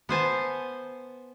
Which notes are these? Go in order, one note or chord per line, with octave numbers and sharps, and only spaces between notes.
B3 C5 G#5 A5